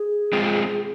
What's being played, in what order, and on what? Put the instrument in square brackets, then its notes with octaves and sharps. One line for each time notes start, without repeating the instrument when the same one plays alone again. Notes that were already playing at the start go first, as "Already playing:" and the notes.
Already playing: [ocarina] G#4
[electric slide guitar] G#3 C4 F4